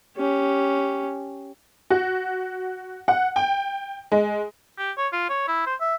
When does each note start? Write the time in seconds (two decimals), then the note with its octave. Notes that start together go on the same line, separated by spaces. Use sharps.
0.17 C#4 G4
1.90 F#4
3.08 F#5
3.36 G5
4.12 G#3
4.78 G4
4.97 C#5
5.12 F4
5.29 C#5
5.48 E4
5.66 C5
5.80 E5